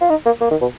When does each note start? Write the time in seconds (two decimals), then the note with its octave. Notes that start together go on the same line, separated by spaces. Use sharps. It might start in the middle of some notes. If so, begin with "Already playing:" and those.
0.01 F4
0.10 D#4
0.25 A#3
0.41 A#3
0.51 D#3
0.61 B2